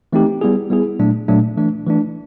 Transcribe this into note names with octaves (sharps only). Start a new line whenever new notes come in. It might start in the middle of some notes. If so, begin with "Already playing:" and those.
E3 A3 C4 D#4 G4
G3 B3 E4 G#4
G3 B3 E4 G#4
A#2 F#3 A3 D4
A#2 F#3 A3 D4
E3 A3 D4
E3 A3 D4